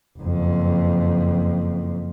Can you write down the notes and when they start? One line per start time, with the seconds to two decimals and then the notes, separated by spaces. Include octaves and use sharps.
0.19 F#1 F2